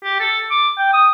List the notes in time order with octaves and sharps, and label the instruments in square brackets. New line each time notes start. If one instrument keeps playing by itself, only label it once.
[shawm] G4
A4
D6
G5
D#6